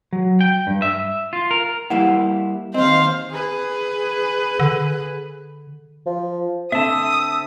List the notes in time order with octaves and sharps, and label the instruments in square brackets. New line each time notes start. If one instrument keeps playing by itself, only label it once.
[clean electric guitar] F#3
G5
G2
E5
F4
A#4
[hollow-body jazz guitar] G3 A#3 E4 [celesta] F#5
[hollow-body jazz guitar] D#2 C4 [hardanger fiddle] C5 F5 [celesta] D#5
[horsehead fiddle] G#4 B4
[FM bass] D3
[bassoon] F3
[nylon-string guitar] D3 C4 [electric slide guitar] E5 A5 [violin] D#6 [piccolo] E6